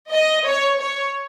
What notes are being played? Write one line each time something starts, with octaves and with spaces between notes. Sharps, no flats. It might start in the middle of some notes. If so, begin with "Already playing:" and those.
D#5
C#5
C#5